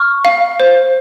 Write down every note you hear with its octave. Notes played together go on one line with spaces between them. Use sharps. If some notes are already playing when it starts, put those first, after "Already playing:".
Already playing: C#6 F6
F5
C5